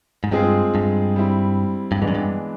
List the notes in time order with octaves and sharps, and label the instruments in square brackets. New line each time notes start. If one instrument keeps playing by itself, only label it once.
[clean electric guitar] G#2
[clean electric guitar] G2 [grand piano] G#3 C4 F4 G#4
[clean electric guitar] G2
[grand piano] G3 C4 E4
[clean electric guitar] G2
[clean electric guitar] G#2 [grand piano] E3 G#3 B3 D4
[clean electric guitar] F#2
G2